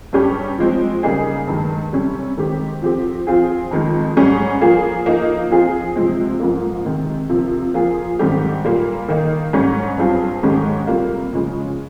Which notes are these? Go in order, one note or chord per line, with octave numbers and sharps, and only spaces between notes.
G2 G3 C#4 G4
F3 G#3 C4
C#3 G3 A#3 D#4 G#4
G2 D#3 G#3
C3 G3 C#4
D#3 G#3 C4 G4
F3 C4 G4
F3 C4 F4 G#4
F2 D#3 G#3
G#2 G3 C#4 G#4
F3 A#3 F4 G#4
F3 A#3 D#4
F3 C4 F4 G#4
C3 F3 G#3 C4
G#2 F3 A#3
C3 D#3 G#3
C3 F3 A#3
F3 A#3 F4 G#4
G#2 D#3 G3 C4 G4
A#2 G3 A#3
D#3 A#3 D#4
G#2 G3 C#4
G2 G3 C4 F4 G#4
G#2 D#3 G#3 C#4 G4
C3 G3 A#3 F4
C#3 F3 G#3 C#4